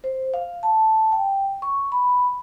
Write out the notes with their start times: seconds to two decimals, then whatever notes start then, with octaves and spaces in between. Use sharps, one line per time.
0.04 C5
0.34 F5
0.63 A5
1.12 G5
1.62 C#6
1.92 B5